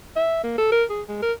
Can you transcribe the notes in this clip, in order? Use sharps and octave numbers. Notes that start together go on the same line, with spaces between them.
E5
A#3
A4
A#4
G#4
G#3
A#4